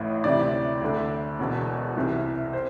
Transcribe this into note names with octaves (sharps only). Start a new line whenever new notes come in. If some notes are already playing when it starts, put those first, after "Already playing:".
Already playing: A1 A2 E3
D2 C3 E3 D5
D2 D3
E1 E2 B2
C2 C3 E3
C5